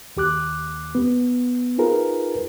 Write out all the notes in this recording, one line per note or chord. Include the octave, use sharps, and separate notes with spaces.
D#2 G4 D6 F#6
B3
D#4 F4 G#4 A#4 B4